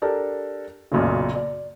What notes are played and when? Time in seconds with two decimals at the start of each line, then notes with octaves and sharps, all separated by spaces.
0.02 D4 G4 A4 A#4
0.92 B1 F#2 A#2 C#3
1.35 D5